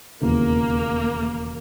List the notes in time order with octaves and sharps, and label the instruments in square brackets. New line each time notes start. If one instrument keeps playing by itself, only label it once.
[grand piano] E1 D#2 C#3 E3 [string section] A#3